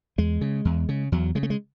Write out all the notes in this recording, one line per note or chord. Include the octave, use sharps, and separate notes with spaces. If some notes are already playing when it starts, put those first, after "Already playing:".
E2 G#3
C#3
E2
C#3
E2 F#3
C#3 G#3
A3
G#3